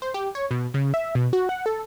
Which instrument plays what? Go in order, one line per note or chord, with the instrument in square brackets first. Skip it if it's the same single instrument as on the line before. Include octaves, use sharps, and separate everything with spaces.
[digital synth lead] C5
G4
C#5
B2
C#3
E5
B2
F#4
F#5
A4